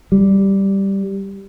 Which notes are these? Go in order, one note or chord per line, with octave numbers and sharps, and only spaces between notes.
G3